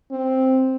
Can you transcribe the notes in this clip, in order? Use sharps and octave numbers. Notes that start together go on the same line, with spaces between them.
C4